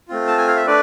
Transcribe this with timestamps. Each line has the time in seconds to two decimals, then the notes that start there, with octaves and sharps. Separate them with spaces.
0.09 A3 C4 F4
0.27 A5
0.38 G#5
0.47 F5
0.56 E5
0.67 A3 D4 B4 D5